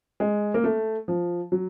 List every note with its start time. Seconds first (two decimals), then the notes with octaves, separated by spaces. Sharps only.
0.20 G#3
0.54 A#3
0.64 A3
1.08 F3
1.52 F#3